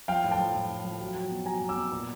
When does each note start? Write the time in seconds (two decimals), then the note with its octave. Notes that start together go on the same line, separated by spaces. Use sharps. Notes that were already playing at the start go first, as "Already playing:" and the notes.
0.08 F3 F5 G5
0.24 A2
0.31 G5 A5
0.39 F3
0.54 A2
0.70 A2
0.84 F3
1.00 F#3
1.16 F#3
1.31 B2
1.46 F#3 G#5 A#5
1.61 B2
1.69 D6 E6
1.77 B2
1.92 A#2